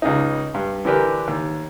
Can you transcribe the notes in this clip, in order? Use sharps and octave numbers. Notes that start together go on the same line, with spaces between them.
C#2 C#3 D#4
G2
D3 E3 D4 G4 A#4 B4
D#2